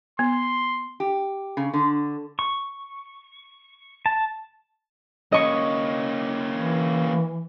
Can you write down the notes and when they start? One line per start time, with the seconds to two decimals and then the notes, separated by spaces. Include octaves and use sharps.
0.19 B3 C6
1.00 G4
1.57 C#3
1.74 D3
2.39 C#6
4.06 A5
5.32 A#3 C#4 D#5 C#6 C#7
6.56 E3